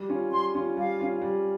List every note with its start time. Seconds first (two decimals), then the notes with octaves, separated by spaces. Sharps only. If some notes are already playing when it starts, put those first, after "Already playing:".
Already playing: G3
0.09 C#4 F4
0.31 G3 C6
0.55 C#4 F4
0.77 G3 F5
0.99 C#4 F4
1.22 G3